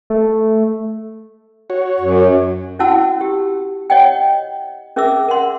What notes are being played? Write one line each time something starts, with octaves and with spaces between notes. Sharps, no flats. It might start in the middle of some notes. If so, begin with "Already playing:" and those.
A3
F#4 C#5
F#2
C#4 E4 F#4 F#5 A5 E6
G4
C#5 D#5 F#5 G5
C#4 G#4 A#4 E5 D6 E6
A#4 F#5 C6